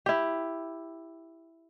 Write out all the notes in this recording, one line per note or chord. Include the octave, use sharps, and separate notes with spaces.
E4 G4